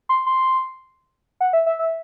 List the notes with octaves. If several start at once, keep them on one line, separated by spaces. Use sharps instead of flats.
C6
C6
F#5
E5
E5
E5